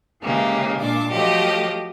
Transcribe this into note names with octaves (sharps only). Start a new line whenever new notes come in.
C#3 E3 G#3 A#3 G4
A#2 D4 D6
F3 F#3 A3 G4 D#5